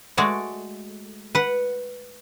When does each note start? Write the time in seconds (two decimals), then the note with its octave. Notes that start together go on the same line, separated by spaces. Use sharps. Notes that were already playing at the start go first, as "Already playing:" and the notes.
0.17 G#3 A3 F#4 D5
1.35 B4 F#5